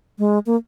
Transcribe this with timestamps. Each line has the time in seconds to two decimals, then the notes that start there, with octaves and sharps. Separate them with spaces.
0.19 G#3
0.46 A#3